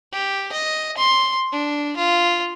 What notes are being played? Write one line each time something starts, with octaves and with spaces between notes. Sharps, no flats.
G4
D#5
C6
D4
F4